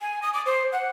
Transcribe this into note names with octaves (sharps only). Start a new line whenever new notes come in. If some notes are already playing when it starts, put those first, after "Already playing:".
G#5
D#6
D6
C5
F#5